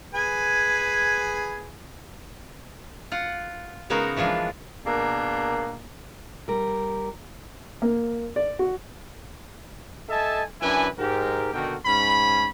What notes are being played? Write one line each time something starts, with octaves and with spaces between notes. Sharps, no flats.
G#4 B4 G#5
F4 F#5
C#3 G#3 B3 D#4 F#4 A#4
E3 F3 G#3 D4 F4
B2 A#3 D4 G#4 A#4
G3 A#4
A#3
D5
F#4
A4 D#5 E5 G#5 A5
F#2 D4 E4 B4 G#5
G#2 G4 A#4
B2 D3 D#3 F#4 A#4 G5
G#2 C#4 B5